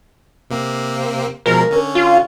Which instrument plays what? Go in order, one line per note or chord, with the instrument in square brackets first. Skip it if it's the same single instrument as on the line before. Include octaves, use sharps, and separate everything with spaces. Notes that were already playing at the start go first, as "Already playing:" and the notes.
[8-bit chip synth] C3 A#3 C4
[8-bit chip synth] B2 F3 G#3 [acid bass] A#4
[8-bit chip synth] D3 C#4
[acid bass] F4